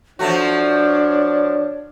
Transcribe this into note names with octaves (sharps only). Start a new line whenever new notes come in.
F3 A3 D4 F#4 C#5